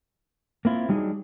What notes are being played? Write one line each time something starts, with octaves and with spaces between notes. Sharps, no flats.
A#3 C4 E4 F4
F#3 G3 D4 D#4 G#4